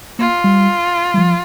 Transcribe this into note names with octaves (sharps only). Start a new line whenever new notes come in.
A#3 F4
G3
G3
F3